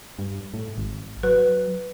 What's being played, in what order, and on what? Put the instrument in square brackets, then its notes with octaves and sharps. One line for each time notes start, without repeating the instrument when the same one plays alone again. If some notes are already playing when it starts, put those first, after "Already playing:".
[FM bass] G2
A2
G#1
[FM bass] F#3 [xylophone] B4